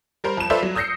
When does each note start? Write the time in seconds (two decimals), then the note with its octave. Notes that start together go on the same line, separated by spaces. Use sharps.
0.24 G3 A#4 C5
0.37 F2 E7
0.50 F4 A4 B4 C5 D5 E5
0.63 F#3
0.75 D#6 E6 G6 A#6 C7 C#7